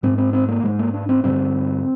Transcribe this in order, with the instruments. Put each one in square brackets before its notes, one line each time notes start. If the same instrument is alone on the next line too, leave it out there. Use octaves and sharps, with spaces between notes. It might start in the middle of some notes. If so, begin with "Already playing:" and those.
[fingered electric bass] G#2 C4
C4
C4
A#3
G#2 G#3
A#3
D4
C4
G2 D3 C4